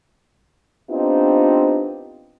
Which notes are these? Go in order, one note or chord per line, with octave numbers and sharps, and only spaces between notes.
B3 C4 D4 D#4 F4 G4